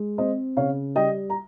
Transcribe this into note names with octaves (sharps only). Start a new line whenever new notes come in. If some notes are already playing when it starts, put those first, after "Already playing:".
Already playing: G#3
C4 C5 D#5
C#3 C#5 F5
G3 D#5 G5
A#5